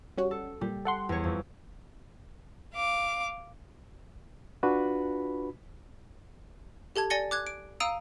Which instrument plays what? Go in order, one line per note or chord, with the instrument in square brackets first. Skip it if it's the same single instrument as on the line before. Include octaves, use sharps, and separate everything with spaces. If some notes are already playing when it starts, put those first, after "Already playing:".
[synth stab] G3 C#4 F#4
[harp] A4
[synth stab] A#2 [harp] G3
[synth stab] A4 F#5 C6
[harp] E2 C#5
F2
[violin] F5 D6
[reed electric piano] D4 F4 F#4 B4 B5
[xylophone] G4 A4 A5 G#6
D5 G#5 A6 A#6 C#7 G7
D6 F#6 G#6
D7
F5 A#5 D#6 E6 D7 D#7